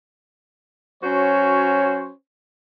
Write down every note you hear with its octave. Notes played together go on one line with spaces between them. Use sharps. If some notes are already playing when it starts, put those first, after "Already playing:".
F#3 C#4 F#4 C5 C#5